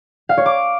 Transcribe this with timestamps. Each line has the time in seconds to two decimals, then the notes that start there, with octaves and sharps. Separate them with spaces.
0.29 F5
0.37 C#5
0.46 D6